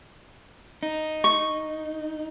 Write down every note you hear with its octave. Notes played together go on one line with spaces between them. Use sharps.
D#4
C#6